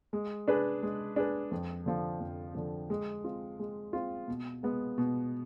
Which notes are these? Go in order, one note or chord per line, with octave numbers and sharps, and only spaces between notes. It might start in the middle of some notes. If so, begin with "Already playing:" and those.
G#3
D4 G#4 B4
G#3
D4 G#4 B4
F2
D3 F3
F2
D3 F3
G#3
C4 F4
G#3
C4 F4
B2
G#3 B3
B2